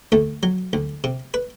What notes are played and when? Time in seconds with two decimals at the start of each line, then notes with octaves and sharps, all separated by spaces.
0.12 D2 A3
0.43 F#3
0.73 D2
1.04 C3
1.34 B4